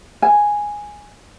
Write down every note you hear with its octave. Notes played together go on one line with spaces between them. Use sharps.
G#5